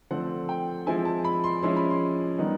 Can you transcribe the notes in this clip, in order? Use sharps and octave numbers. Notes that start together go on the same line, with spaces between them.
D3 F3 A3 C4 F#5
G5
F3 G#3 C4 E4 G#5
A5
B5
C6
F3 G#3 C#4 E4 C6
B5
C6
D#3 G3 B3 D#4